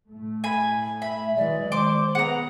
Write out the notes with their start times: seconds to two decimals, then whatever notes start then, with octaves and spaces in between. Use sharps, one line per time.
0.12 A2 A3
0.44 G#5 B5
1.02 E5 B5
1.36 E3 F#3 G#3 D5
1.72 D#3 C5 C6 D6
2.15 B3 G#4 F#5 A#5